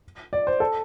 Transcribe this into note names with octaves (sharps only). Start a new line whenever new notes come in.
D5
C5
A4